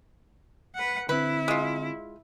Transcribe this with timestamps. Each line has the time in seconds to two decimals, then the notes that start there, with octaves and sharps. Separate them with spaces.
0.75 B4 F#5
1.09 D3 C4 E4 B4
1.48 G#3 F4